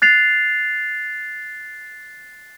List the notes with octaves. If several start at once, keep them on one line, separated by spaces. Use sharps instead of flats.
F#6 A6 C7 F7